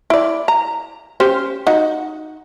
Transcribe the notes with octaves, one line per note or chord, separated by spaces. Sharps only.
E4 D5
A#5
C#4 G4 C5
D#4 F#4 F#5